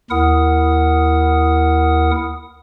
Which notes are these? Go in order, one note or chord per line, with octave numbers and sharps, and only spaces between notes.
D#2 E4 A#4 F#5 D#6